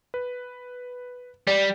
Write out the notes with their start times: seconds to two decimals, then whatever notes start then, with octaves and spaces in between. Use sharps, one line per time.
0.14 B4
1.47 G3 D5